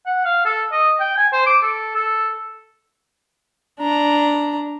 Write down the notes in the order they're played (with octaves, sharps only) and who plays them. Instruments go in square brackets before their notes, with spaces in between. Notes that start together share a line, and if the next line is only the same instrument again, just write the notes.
[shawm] F#5
F5
A4
D#5
G5
G#5
C5
D6
A4
A4
[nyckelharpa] D4 A#5